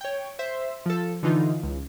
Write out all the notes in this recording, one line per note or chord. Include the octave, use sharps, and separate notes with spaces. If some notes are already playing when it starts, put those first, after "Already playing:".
C#5 G5
C5 E5
F3 A4
D3 E3 D#4 F4
C#2